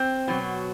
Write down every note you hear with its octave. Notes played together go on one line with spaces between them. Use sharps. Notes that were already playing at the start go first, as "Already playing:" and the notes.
Already playing: C4
B2 F#3